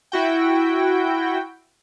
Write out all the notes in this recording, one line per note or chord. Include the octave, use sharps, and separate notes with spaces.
E4 F#4 G5